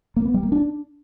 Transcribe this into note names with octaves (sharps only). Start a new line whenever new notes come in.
A#3
B3
G3
A#3
D4